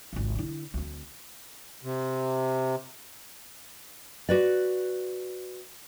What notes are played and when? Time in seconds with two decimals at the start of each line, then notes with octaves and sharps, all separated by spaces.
0.13 G#1 C#2
0.35 D3 E4
0.74 D2 C4
1.84 C3
4.29 F#4 B4 D5